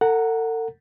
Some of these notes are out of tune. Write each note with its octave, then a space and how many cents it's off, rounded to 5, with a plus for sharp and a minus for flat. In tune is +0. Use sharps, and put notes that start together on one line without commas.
A4 +40 F#5 +0 A#5 +0